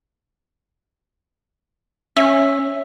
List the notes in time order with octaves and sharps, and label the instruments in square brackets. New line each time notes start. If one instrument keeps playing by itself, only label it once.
[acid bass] C#4 [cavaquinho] E5